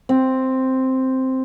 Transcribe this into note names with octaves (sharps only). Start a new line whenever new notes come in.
C4